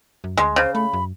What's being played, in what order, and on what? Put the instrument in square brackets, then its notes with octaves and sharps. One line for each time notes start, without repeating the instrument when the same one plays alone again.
[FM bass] F#2
[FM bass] D2 [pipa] G#3
[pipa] C#3 [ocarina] C5
[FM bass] A3 [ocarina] B5
[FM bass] F#2